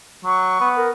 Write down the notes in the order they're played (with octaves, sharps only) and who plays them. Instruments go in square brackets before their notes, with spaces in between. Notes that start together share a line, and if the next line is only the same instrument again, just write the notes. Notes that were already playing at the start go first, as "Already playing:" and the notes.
[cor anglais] F#3 [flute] C#6
[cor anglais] B3
[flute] A#4